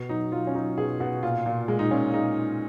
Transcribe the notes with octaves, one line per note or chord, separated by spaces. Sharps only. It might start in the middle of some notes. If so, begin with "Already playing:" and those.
Already playing: B2
F#3 D#4
F#3 F4
C#4
F#3 D#4
B2 G#4
B2 F#4
A#2 F4
A#2
G#3
D#4
A#2 C#4
G#3 D#4